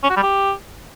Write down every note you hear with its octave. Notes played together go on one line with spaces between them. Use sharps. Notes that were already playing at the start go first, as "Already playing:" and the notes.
C#4
F#4
G3
G4